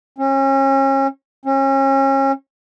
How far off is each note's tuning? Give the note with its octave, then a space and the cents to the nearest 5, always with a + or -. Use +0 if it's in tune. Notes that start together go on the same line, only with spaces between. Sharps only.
C#4 -35
C#4 -35